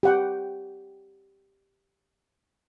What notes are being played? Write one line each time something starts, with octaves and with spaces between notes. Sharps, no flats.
G4 F#5 G5